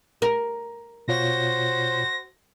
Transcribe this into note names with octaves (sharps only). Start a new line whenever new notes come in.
A#4
B2 F4 F#4 C5 C#5 A#6